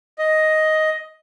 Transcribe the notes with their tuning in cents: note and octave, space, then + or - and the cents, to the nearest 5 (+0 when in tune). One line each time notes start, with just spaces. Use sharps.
D#5 +5